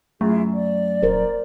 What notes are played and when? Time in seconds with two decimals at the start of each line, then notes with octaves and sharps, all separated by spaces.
0.21 F#2 A3 E4 F4 G#4
0.54 D5
1.03 D#1 A#4 C5